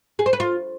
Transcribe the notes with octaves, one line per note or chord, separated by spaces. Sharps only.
G#4
C5
B4
F4